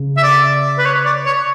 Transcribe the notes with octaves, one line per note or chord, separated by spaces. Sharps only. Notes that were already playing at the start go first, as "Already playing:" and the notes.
Already playing: C#3
E5
D5
B4
C#5
D5
C#5